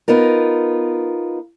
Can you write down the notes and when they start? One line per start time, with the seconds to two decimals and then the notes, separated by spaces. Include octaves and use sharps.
0.08 B3 D#4 F4 A#4